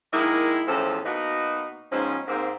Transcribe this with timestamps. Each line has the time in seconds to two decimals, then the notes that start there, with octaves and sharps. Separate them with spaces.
0.13 D#3 G#3 A#3 E4
0.68 E2 A2 F3 C4 C#4 A4
1.06 B2 A#3 B3 D#4 F#4
1.91 G#2 B2 F3 C4 C#4 D#4
2.28 G#2 A#3 C4